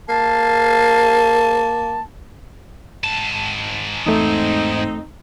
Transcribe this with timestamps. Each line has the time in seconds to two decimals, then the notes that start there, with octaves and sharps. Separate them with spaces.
0.09 A#3 A5
3.04 G#2 A5
4.06 E2 A3 C4 D#4